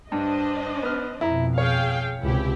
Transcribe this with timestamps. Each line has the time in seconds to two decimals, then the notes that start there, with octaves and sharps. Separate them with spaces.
0.12 G2 D4 C5 D#5
0.83 B3 F6
1.21 F2 B2 E4 A#5
1.58 G#4 C#5 F5 G5
2.22 C#2 C3 E4 G4